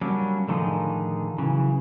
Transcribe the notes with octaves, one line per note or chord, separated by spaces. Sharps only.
F#3 G3 A#3 C#4 D4
A2 D3 D#3 F3 D#4 G#4
C#3 E3 F#3